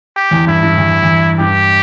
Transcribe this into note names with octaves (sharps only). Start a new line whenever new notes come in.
G4
E2
G2 E4
G2
E2
E2
G2 G4